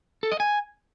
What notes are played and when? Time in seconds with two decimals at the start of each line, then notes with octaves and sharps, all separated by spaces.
0.23 A4
0.31 D#5
0.40 G#5